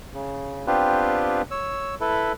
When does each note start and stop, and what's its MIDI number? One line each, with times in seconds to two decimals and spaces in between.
0.14 0.66 49
0.67 1.42 59
0.67 1.42 60
0.67 1.42 62
0.67 1.42 65
0.67 1.42 67
0.67 1.42 71
1.51 1.95 73
1.51 1.95 88
2.01 2.32 64
2.01 2.32 69
2.01 2.32 71